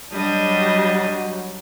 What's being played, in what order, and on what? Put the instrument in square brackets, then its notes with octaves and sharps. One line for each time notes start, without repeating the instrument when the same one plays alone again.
[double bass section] F#3 [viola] G3 [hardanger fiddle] D4 D#5